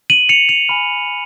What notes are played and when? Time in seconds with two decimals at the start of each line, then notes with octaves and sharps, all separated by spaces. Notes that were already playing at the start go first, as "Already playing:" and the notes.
0.10 D#7 F#7
0.29 C#7 F7
0.49 C#7 F7
0.69 G#5 B5 F6